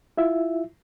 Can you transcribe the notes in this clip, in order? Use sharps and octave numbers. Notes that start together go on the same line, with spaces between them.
E4 F4 E5